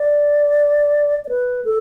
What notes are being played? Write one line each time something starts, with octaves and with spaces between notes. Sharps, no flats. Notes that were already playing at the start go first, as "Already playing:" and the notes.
Already playing: D5
D5
B4
A4